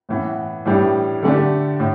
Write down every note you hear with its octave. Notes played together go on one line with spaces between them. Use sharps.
A2 E3 B3
A2 E3 G3 D4
D3 A3 D4 G4
A2